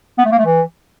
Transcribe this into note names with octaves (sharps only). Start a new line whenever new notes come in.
B3
A3
A#3
A3
E3